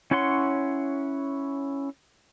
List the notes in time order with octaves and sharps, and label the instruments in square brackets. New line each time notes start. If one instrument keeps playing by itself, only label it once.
[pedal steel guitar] C#4 E4 C#5 F#5 C6